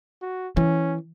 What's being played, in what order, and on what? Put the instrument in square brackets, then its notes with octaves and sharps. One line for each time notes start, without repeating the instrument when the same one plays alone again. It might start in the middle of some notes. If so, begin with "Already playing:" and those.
[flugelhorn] F#4
[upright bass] E3 [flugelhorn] C#4